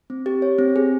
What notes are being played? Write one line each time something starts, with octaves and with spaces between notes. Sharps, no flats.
C4
G4
C#5
C4
G#4